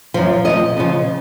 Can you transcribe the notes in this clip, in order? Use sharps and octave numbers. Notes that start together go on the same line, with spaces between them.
F#2 F3
F2 C#3 F3 D#5
F2 C#3 F3